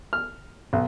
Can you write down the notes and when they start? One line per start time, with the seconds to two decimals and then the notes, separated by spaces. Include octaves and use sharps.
0.13 F6
0.73 B1